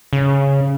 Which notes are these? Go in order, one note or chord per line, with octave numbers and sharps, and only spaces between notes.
C#3